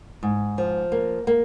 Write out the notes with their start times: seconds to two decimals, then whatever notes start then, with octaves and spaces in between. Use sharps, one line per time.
0.23 G#2
0.58 F3
0.92 A#3
1.27 A#3